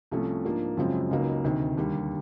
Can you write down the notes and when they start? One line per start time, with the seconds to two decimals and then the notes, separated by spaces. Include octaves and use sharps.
0.11 C2 C3 F3 A3 C#4
0.44 G#2 F3 A#3 D4
0.77 F#2 C#3 F3 G#3 C4
1.11 C#2 C#3 F#3 A#3 D#4
1.44 D2 C3 D#3
1.77 D#2 D3 G3